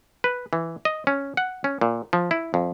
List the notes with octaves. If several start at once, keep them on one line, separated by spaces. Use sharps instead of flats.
B4
E3
D#5
C#4
F#5
C#4
A#2
F3
E4
F2